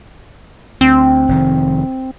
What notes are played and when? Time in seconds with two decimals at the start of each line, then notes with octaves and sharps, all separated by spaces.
0.81 D2 C4
1.28 F1 C3 D#3